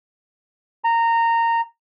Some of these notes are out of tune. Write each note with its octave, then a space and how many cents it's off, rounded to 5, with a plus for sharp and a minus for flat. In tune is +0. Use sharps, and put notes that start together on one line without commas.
A#5 -15